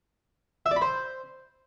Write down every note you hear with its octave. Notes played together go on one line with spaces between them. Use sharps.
E5
D5
B5
C5